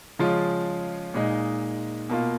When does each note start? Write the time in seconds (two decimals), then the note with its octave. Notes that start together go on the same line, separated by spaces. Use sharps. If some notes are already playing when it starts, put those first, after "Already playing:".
0.19 C#3 F3 G#3 C#4 F4
1.14 A#2 G#3 D#4
2.09 B2 A#3 F4